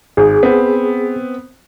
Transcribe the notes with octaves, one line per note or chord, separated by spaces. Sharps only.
G#1 G#4
B3 C4